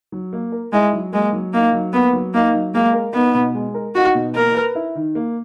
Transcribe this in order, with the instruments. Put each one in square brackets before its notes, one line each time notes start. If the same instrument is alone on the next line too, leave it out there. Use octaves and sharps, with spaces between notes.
[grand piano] F#3
A#3
A#4
[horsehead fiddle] G#3 [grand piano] E4
[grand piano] F#3
[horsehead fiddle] G#3 [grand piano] A#3
[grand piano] F#3
[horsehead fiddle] A#3 [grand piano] D#4
[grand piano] F#3
[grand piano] A#3 [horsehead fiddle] B3
[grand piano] F#3
[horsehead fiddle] A#3 [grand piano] D#4
[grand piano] F#3
[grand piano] G#3 [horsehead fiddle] A#3
[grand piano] A#4
[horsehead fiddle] B3 [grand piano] D#4
[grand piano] B2
G#3
A#4
[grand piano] D#4 [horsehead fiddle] F#4
[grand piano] B2
[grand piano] A#3 [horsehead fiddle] A#4
[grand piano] B4
E4
D#3
A#3